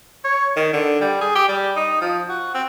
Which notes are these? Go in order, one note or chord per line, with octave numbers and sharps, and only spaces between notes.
C#5
D#3
D3
G3
G#4
G4
G3
D#4
F3
F#4
C4